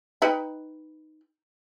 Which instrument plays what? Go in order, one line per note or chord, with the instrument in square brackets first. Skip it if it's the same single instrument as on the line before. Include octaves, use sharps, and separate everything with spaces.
[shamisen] D#4 B4 G5